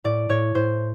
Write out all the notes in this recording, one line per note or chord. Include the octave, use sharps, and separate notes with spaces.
A2 D5
A2 C#5
A2 C5